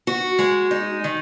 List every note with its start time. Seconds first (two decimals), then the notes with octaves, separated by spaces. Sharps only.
0.07 F#4
0.39 G#3
0.71 D#4
1.04 D#3